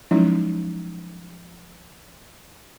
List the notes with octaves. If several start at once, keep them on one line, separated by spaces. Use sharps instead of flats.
F3 F#3 G#3 C#4 D#4 E4